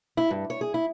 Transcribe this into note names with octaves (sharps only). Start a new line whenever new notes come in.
E4
G2
C#5
G#4
E4